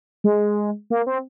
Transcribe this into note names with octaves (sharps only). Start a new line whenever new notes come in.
G#3
A#3
C4